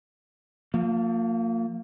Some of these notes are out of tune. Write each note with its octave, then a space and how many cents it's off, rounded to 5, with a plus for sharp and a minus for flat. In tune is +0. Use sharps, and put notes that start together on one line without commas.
F3 +20 A#3 -30